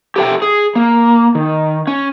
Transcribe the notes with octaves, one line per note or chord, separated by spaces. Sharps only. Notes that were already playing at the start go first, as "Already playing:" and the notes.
G4 A4 C5 E5 G5
G#4
A#3
D#3
C#4